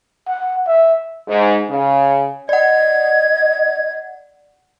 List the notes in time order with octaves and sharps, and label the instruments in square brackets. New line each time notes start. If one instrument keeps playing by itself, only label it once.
[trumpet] F#5
E5
[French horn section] G#2
C#3
[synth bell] D5 F#5 [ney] D#5 [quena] G#6